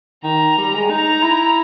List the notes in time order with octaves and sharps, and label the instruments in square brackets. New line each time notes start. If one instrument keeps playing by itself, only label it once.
[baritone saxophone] D#3 [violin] A#5
[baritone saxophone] G3
G#3
[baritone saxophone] D#4 [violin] A#5
[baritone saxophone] E4